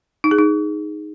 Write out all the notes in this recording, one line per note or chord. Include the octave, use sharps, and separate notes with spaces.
D#4
G#4
D#4